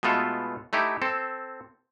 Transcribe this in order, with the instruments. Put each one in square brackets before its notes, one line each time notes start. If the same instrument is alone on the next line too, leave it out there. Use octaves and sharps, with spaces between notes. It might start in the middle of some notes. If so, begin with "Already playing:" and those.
[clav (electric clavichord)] B2 G#3 A3 B3 F4 A4
A3 D#4 E4 G4
C4 A4